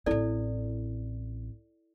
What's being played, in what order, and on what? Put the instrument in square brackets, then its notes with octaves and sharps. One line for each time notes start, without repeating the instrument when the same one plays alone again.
[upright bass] A1 C4 [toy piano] E4 A4 D5